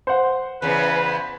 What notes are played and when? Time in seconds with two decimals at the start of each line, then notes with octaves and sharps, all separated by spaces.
0.07 C5 F#5
0.62 E2 C#3 B4